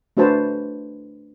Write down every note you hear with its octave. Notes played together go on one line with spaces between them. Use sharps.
A3 D4 F#4 B4 C5 A5